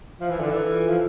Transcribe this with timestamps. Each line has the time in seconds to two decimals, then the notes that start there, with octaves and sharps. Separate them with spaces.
0.20 F3 E5
0.30 E3
0.40 D3
0.45 E3 A4
0.71 F4
0.89 F3